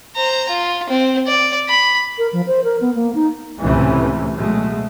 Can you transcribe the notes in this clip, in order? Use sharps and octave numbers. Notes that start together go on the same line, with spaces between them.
C5 A#5
F4
C4
D5
B5
A#4
F3
C5
A#4
B3
A#3
D#4
C#2 A2 C3 E3 A3 C#4
B2 F#3 G#3 A3